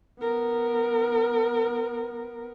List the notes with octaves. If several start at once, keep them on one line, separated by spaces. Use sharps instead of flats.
B3 A#4